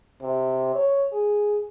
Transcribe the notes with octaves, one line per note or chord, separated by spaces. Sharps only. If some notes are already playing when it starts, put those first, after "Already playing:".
C3
C#5
G#4